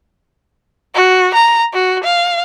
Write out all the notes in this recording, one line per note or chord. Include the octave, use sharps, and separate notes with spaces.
F#4
A#5
F#4
F5